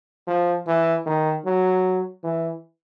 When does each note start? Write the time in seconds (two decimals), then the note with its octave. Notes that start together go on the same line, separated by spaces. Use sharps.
0.28 F3
0.67 E3
1.06 D#3
1.45 F#3
2.24 E3